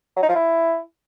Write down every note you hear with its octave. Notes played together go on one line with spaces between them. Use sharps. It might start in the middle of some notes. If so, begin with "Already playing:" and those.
F#3
D#4
F3
E4